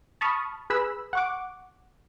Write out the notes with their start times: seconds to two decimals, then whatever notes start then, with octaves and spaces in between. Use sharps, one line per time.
0.21 A5 B5 C#6 D#6 F6
0.70 G#4 B4 B5 E6
1.13 F#5 C#6 D6